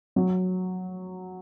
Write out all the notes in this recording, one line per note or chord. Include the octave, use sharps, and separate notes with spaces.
F#3